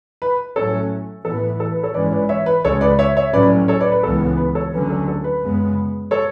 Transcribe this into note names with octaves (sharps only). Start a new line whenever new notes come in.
B4
A2 F#3 A3 C#4 A4 C#5
A2 E3 B3 A4
B4
A4
B4
A4 C#5
G#2 E3 G#3 C#4 B4 D5
B4 D5
C#5 E5
B4
C#2 C#3 G#3 A4 C#5
B4 D5
C#5 E5
C#5 E5
A2 F#3 C#4 B4 D5
A4 C#5
B4 D5
B4
C#2 C#3 E3 B3 A4
B4
A4 C#5
D2 D3 F#3 C#4 B4
A4
A4
B4
F#2 C#3 G#3 B3
A4 C#5